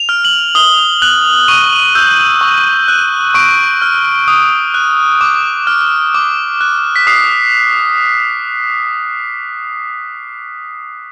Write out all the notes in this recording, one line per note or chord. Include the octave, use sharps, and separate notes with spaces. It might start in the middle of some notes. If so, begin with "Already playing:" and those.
Already playing: F7
F6
F#7
D#6 G7
F#6 F#7
C#6 D#7
E6 G6
C#6
F#6
C#6 D7
F6
D#6
F#6
D6
F6
D6
F#6
B6
D#6 C7